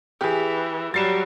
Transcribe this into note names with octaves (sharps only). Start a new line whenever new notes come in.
E3 G4 G#4
F#3 G3 A6 C7 E7